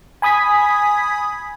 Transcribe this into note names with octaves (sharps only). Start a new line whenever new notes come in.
G#5 B5 D#6 G#6 B6